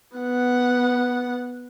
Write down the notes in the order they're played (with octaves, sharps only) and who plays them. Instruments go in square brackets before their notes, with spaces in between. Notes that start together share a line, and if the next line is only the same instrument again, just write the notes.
[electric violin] B3 F#5